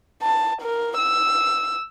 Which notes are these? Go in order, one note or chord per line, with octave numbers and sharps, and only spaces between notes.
A5
A#4
E6